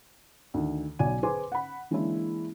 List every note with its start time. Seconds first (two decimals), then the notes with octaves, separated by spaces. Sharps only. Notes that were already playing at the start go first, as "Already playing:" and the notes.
0.54 D2 D#3
0.99 B1 F#3 D5 G#5 D#7
1.23 G#4 B4 C5 G#5 C6 D6
1.52 F#5 B5
1.91 E3 G#3 A#3 C#4 D4 E4